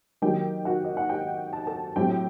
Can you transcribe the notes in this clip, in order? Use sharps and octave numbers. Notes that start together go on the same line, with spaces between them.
D#3 F#3 A#3 D#4 G4 G5
F#4 F#5
D#5
F#5
G4 G5
A5
A4 A5
A2 F#3 C4 G4 G5